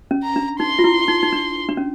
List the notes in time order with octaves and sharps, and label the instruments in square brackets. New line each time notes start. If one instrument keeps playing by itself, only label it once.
[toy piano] C#4
[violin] A#5
[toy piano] D4
[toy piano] D#4 [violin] C6
[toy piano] F4
E4
D#4
D#4
D4
D4
C#4